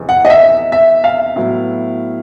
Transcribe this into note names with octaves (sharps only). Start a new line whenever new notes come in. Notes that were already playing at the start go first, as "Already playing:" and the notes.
Already playing: F1 E2
F#5
D#5
E5
E5
F5
A2 F#3 B3 E4